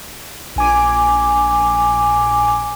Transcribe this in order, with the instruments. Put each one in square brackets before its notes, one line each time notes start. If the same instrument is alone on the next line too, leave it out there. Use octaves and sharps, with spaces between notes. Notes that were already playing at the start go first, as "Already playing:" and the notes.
[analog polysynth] A#1 G#5 D6